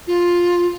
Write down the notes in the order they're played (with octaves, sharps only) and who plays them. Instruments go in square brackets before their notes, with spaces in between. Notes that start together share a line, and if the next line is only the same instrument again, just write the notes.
[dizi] F4